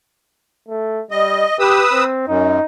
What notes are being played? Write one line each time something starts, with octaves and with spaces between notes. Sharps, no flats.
A3
G3 D#5
G4 B4 D#6 E6
C4
F#2 D#4